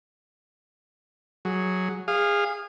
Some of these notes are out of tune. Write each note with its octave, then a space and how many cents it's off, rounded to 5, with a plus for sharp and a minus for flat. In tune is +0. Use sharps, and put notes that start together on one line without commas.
F#3 +0 G#4 +0
G#4 -25 F5 +0 D#6 -25